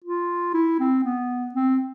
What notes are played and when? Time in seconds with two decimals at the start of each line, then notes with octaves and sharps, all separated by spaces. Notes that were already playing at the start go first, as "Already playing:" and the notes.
0.04 F4
0.54 E4
0.80 C4
1.04 B3
1.55 C4